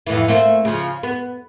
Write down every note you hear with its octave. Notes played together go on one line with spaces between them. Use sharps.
F2 A2 E3
A3 A#3 C4
C#3 F3
B3